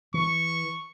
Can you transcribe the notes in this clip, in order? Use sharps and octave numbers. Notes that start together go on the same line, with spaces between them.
E3 C#6